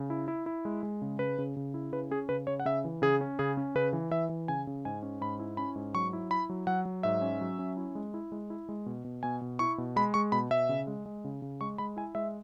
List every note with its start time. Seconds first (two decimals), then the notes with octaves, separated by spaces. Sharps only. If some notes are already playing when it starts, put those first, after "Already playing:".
Already playing: C#3
0.10 E4
0.28 E4
0.46 E4
0.65 G#3
0.83 G#3
1.02 C#3
1.19 C#3 B4
1.38 C#3
1.56 C#3
1.74 E4
1.92 C#3 B4
2.11 C#4 G#4
2.29 C#3 B4
2.47 C#3 C#5
2.60 F#5
2.65 C#3 E5
2.85 E3
3.02 C#3 G#4
3.21 C#4
3.39 C#3 G#4
3.57 C#4
3.75 C#3 B4
3.93 E3
4.11 E3 E5
4.29 E3
4.48 C#3 G#5
4.67 C#3
4.85 G#2 G#5
5.03 C#4
5.21 G#2 B5
5.39 E4
5.57 C#4 B5
5.76 G#2
5.94 F#3 C#6
6.13 E4
6.31 E4 B5
6.50 F#3
6.67 F#3 F#5
6.85 F#3
7.03 G#2 E5
7.22 C#4
7.41 F#3
7.59 C#4
7.77 E4
7.95 G#3
8.14 E4
8.32 G#3
8.50 E4
8.69 G#3
8.86 B2
9.05 B2
9.23 B2 G#5
9.41 B2
9.59 E4 C#6
9.78 B2
9.96 G#3 B5
10.14 G#3 C#6
10.32 B2 B5
10.51 B2 E5
10.69 C#3
10.87 G#3
11.06 G#3
11.24 C#3
11.42 C#3
11.61 G#3 C#6
11.78 G#3 B5
11.96 E4 G#5
12.15 G#3 E5